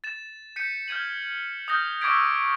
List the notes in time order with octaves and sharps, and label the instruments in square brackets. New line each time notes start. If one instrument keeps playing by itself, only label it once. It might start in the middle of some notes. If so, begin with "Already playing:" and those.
[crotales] A6 E7
G6 B6 C#7 D#7
F6 G6 G#6 D#7 F#7
D#6 F6 G6 A#6
C#6 D6 E6 G#6 B6 D7